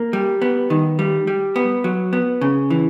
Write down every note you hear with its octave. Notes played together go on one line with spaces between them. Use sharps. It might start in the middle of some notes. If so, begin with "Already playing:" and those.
Already playing: A#3
G3
B3
D#3
G3
G3
B3
F#3
B3
C#3
E3